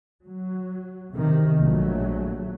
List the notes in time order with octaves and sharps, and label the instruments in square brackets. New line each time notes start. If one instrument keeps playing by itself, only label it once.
[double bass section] F#3
C3 D#3
A#1 F#3 A3